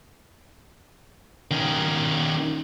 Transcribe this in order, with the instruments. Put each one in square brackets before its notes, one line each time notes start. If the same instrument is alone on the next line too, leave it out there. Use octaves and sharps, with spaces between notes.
[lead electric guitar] D#3 C#4